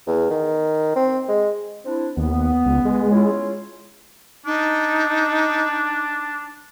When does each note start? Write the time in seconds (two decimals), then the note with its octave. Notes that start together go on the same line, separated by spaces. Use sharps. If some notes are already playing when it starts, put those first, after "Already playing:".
0.07 E2
0.30 D#3
0.96 C4
1.28 G#3
1.85 C4 D4 E4
2.17 D#2 B3
2.66 C#2
2.85 G#3
3.11 C#4 E4 F4
4.46 D4 D#4